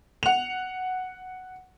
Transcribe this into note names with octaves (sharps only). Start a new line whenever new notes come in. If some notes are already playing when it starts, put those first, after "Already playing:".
F#5 F7